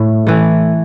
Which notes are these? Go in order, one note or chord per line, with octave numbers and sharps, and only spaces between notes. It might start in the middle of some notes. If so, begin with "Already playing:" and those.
Already playing: A2 A3
E3 A3